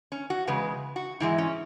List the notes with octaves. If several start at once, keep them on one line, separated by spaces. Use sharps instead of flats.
C#4
F#4
E2 C#3 G#3 B4
F#4
G#2 E3 G#3 E4
C#4